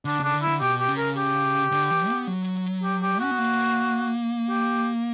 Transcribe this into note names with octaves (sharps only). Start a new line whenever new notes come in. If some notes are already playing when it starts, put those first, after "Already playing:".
D3 D4
C#3 D4
D3
E4
D3
B2 G4
G4
C#3
A#4
G4
D3
E3
B3
F#3
G4
G4
C#4 F#4
B3
A#3
G4